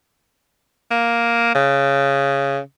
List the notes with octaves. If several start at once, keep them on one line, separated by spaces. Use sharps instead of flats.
A#3
C#3